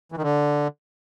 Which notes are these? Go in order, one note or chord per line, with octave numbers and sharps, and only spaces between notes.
E3
D#3
D3